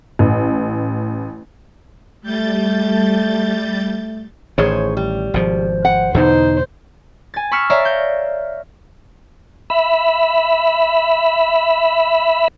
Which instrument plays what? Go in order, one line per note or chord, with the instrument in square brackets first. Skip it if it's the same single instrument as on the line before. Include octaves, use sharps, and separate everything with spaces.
[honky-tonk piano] A1
[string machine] G3 G6 A6 [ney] A3
[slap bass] A1 A2 D#3 [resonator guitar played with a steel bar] G#4 C5 C#5
[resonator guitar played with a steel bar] G3
[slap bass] G#1 B2 F3 [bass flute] C5
[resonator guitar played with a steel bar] F#5
[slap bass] E2 B2 D3 [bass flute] D#4 [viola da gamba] C5
[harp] G#5 A6
B5 C#6 E6 F6 C#7
C#5 D5 E5 F5 A#5
G6
[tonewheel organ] E5 B5